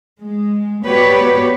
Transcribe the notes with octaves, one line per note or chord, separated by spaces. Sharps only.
G#3
B3 F#4 G4 B4 C#5 D5